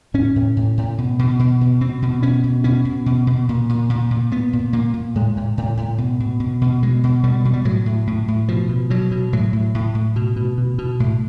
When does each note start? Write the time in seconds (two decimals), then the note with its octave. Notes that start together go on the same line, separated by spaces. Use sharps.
0.14 A2 C#4
0.36 A2
0.57 A2
0.77 A2
0.98 B2
1.19 B2
1.39 B2
1.61 B2
1.81 B2 C4
2.02 B2
2.23 B2 C#4
2.44 B2
2.64 B2 C#4
2.85 B2
3.06 B2
3.27 B2
3.49 A#2
3.69 A#2
3.90 A#2
4.11 A#2
4.31 A#2 B3
4.53 A#2
4.73 A#2 A#3
4.94 A#2
5.15 A2 G#3
5.37 A2
5.57 A2
5.77 A2
5.98 B2
6.20 B2
6.40 B2
6.61 B2
6.83 B2 G#3
7.04 B2
7.23 B2 G3
7.45 B2
7.53 G3
7.65 A2 F#3
7.86 A2
8.07 A2
8.28 A2
8.48 B2 F3
8.69 B2
8.90 B2 F#3
9.11 B2
9.33 A2 F#3
9.53 A2
9.75 A2
9.95 A2
10.16 B2
10.36 B2
10.58 B2
10.78 B2
11.00 A2